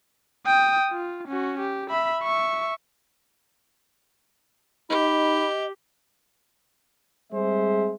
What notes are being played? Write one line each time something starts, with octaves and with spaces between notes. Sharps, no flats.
G5 D#6
F4
C#4 F#4
G4
E5 B5
E5 C#6
D#4 G4 D#5 B5
G3 G#3 C4 G#4 C5 E5